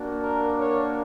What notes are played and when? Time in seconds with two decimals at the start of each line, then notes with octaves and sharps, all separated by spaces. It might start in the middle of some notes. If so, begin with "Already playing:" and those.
Already playing: A#3 D4 F#4
0.22 A#4
0.57 A#4 C#5